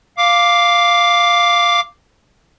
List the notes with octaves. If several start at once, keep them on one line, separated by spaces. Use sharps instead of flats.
F5 D6